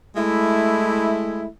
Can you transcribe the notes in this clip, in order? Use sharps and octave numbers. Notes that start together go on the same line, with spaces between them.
G#3 A3 E4